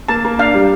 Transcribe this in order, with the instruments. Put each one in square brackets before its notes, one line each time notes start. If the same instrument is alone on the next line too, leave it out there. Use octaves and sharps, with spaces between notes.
[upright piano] A#3 [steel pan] A5
[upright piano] A#3
[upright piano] D4 [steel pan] F5
[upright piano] G3